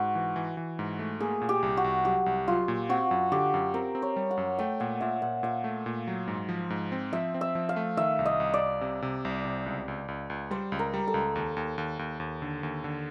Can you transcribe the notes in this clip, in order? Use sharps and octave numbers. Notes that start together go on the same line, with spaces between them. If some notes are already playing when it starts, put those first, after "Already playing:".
Already playing: G#2 F#4
E3
E3
E3
G#2
A3
A#3 G#4
A#2
G4
C2
F#4
C2
F#3 G4
C2
F#3 F4
A#2
C4 F#4
F#2
D3 G4
F#2
C4 A#4
C4
C#5
G3
F#5
F#2
A3 G5
A#2 F#5
A#2 E5
A#2 F#5
A#2 F5
A3
A#2
F#3
G#2
F3
G#2
C4
F3 E5
C4
E5
F3
F5
A3
D#3 E5
C2
D#5
C2
D5
C2
C3
C3
C2
C3
C#2
C#2
C#2
C#2
G3 C5
C#2
A#4
G3
A4
C#2
D#2
D#2
D#2
D#2
D#2
D3
D#2
D3